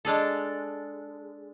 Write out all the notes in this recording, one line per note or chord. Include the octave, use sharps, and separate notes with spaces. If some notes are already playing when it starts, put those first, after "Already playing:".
G#3 D4 G#4 A4